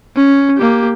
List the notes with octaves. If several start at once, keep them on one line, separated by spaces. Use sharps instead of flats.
C#4
A#3 G4